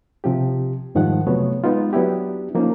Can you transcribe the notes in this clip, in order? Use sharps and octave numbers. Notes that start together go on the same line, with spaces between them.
C3 F3 C4 G4
F2 G#2 D#3 F3 G3 F#5
C3 F3 F#3 A3 B3 C#5
G#3 B3 D#4 F4
F#3 B3 D4 E4 G4
F3 A#3 C#4 D#4